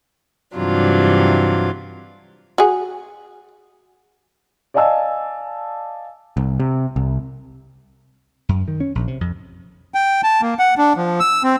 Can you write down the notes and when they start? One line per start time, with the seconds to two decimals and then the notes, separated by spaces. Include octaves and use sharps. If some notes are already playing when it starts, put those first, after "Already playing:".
0.56 G2 C3 E3 F#3 D4 F4
2.58 F#4 G#4
4.74 D5 D#5 F5 G#5 A5 E6
6.37 C2
6.60 C3
6.96 C2
8.49 F#2
8.68 D#3
8.80 C#4
8.95 A#1
9.08 C3
9.21 F2
9.94 G5
10.23 A5
10.41 A#3
10.59 F#5
10.78 D4
10.96 F3
11.20 E6
11.43 C4